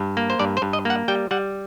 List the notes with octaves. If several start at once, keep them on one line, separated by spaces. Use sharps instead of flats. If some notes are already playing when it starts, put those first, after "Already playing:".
Already playing: G2
A#3
C5
G2 D5
C5
G2
D#5
A#3 F#5
G3 G5
G3 F#5